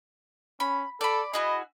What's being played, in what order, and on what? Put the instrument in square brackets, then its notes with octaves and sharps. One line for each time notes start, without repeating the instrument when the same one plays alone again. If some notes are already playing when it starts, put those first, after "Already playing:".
[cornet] C#4 [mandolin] B5
[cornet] A4 [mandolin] D5 B5
[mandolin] E4 F#4 G#4 [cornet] D#5